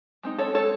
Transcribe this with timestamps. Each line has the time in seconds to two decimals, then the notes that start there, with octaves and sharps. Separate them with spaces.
0.23 G#3 C4 D#4
0.38 A4 C#5
0.54 G#3 C4 D#4 A4 C#5